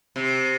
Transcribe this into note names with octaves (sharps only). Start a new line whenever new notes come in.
C3